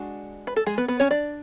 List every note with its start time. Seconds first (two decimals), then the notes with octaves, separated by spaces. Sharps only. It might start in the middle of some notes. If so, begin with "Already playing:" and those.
Already playing: G#3 D4 F#4
0.47 B4
0.56 A4
0.66 G#3 G#4
0.78 B3 B4
0.88 B3 B4
1.00 C#4 C#5
1.11 D4 D5